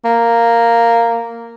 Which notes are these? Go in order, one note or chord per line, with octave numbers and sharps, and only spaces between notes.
A#3